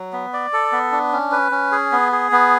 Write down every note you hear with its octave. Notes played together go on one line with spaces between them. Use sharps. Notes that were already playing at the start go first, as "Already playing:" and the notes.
Already playing: F#3
B3
D5
A4
B3
D4
C#4
B4
C#4
G#4
B3
G#4
B3